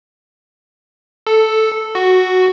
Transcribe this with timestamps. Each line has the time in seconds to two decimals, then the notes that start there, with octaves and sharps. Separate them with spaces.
1.27 A4
1.95 F#4